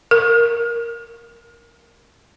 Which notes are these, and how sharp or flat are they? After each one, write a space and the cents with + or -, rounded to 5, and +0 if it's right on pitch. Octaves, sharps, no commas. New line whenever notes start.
A#4 +5